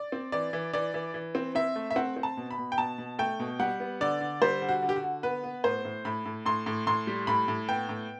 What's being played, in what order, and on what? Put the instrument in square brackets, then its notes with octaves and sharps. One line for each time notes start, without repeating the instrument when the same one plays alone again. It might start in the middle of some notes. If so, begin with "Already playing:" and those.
Already playing: [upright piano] D5
C4
E3 D5
E3
E3 D5
E3
E3
C4
C4 E5
A3
E5
C4 F#5
C4
A5
B2
B5
B2
G5
B2 A5
B2
A3 G5
B2
G3 F#5
B3
D3 D5
D3
G3 C5
D3
F#4
D3
G4
F#4
D3
B3 B4
B3
A2 C5
A2
A2 B5
A2
A2 C6
A2
A2 C6
G3
A2 B5
A2
B3 G5
A2